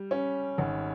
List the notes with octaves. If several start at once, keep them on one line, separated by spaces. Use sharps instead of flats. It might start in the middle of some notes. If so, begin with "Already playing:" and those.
Already playing: G3
C#4
G#1